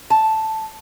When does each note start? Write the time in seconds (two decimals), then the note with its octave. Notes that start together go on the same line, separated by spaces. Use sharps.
0.10 A5